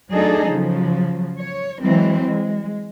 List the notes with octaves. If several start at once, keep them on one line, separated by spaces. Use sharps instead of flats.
F#3 A3 D4 D#4 G#4 A4
C#3 F3 F#3
C#5
E3 F#3 G#3 C4
G#3